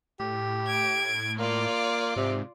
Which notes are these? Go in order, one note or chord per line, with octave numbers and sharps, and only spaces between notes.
A2 G4
G#6 D7
A#3 F4 D5
G#2 C3